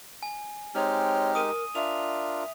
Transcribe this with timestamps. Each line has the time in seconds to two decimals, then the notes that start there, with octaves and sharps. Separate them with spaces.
0.23 G#5
0.75 G#3 C4 D#4 G4 C#5 F6
1.35 A#4 D#6 D#7
1.75 D4 F4 A#4 E5 F7